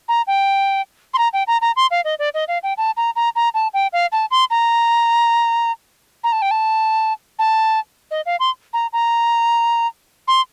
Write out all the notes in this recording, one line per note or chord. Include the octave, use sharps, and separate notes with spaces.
A#5
G5
C6
A#5
G5
A#5
A#5
C6
F5
D#5
D5
D#5
F5
G5
A5
A#5
A#5
A#5
A5
G5
F5
A5
C6
A#5
A#5
A5
G5
A5
A5
D#5
F5
C6
A#5
A#5
C6